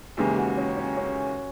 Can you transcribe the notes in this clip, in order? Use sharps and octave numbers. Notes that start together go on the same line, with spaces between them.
D#2 C#3 E3 G#3 G4
F#4
C#4
C#4
C#4